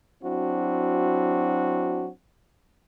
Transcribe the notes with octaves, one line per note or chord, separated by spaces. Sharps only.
F#3 C4 D4 E4 F#4